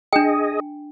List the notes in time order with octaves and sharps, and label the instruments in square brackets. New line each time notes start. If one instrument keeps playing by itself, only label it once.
[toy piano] D4 G5 [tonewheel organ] G#4 D#5